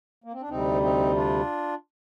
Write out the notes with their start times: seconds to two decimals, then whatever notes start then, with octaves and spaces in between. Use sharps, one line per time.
0.24 A#3
0.33 C4
0.41 D4
0.49 D2 C3 G3 C4 D#4
0.82 C4 D#4
1.15 D4 F4